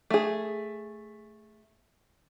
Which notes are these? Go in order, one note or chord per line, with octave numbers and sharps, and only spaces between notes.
A3 G#4